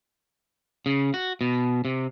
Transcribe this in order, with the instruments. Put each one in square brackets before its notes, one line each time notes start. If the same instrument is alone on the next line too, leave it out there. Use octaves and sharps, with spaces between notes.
[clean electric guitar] C#3
F#4
B2
C3